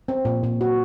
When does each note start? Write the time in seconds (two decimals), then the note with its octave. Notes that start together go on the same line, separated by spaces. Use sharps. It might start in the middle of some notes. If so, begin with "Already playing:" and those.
0.08 C4
0.25 A#2
0.44 A#2
0.61 F#4